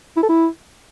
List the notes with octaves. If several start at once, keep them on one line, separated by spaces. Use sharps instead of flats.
E4
A4
E4